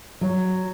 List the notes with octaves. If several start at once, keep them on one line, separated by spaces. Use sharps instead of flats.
F#3